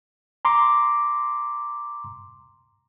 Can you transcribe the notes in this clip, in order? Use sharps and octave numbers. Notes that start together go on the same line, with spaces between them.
A#5 C6 D6